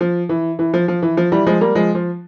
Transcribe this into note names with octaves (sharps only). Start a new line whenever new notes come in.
F3
E3
E3
F3
F3
E3
F3
E3 G3
F3 G#3
G3 A#3
F3 G#3
F3